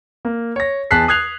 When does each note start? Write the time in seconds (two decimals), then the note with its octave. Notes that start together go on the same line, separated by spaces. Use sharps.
0.25 A#3
0.56 C#5 A#6
0.91 E2 G#4 A5 F#6 B6 C7
1.08 D#6 F#6 G#6 C7 F7